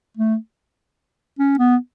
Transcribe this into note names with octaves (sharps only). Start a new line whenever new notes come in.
A3
C#4
B3